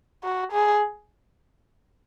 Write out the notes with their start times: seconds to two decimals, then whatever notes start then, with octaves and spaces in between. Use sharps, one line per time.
0.24 F#4
0.52 G#4